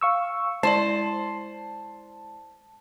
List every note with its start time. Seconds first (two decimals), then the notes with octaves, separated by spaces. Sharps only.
0.01 F5 C#6 E6
0.63 G#3 E4 C5 D5 A5